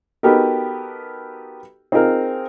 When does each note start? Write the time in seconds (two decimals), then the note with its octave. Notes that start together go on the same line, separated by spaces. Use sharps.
0.23 B3 D#4 F#4 G4 A4 A#4
1.92 C4 D#4 F4 G#4 A#4